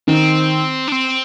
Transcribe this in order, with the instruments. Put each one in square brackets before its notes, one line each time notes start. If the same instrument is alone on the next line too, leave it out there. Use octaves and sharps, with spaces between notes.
[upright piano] D#3 [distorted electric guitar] C4
[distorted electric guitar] D4
C4